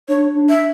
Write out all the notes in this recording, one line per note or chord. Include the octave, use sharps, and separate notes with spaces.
D4 C#5
D4
E5